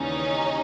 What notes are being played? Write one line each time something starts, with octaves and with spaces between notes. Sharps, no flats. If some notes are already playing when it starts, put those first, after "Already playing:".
Already playing: D#2 C#3 E3 G3 C#4 D#4